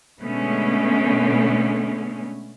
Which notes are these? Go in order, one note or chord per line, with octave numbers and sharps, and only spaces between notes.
B2 D3 G#3 A3 B3 C#4